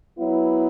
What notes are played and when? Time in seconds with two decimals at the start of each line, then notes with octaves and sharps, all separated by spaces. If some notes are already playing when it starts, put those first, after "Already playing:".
0.18 F#3 B3 E4